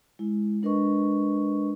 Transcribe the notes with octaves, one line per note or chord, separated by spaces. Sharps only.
G#3 E4
G#3 D4 A#4 B4 D#5 C#6